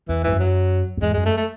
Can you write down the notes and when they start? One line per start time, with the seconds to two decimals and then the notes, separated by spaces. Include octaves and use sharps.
0.09 E2 E3
0.24 G#2 E3
0.32 F#2
0.39 F#3
0.97 F#2
1.02 E2 G#2 G#3
1.14 G#3
1.18 F#2
1.26 A3
1.37 A3